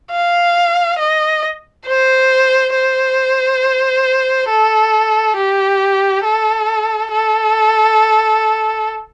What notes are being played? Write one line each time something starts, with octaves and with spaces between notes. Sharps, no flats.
F5
D#5
C5
C5
A4
G4
A4
A4